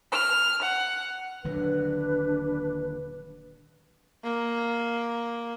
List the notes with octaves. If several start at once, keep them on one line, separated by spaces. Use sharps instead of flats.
F6
F#5
D#1 D3 F#3 D4 B4
A#3